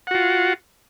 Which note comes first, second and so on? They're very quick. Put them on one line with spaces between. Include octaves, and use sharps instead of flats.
F#5 F#4 F4